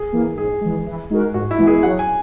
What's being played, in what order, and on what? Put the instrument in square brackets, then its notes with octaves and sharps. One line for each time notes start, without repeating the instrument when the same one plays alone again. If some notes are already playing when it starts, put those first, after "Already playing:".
Already playing: [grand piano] G#4
[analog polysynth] E3 A#3
[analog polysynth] G#2 [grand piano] G#4
[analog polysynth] E3 G#3
E3
G#3 D#4 F#4 A#4
[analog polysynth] G#2 [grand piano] F#4
[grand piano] E4
[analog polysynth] E3 G#3 B3
[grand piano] G#4
[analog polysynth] F#3 [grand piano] F#5
[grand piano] G#5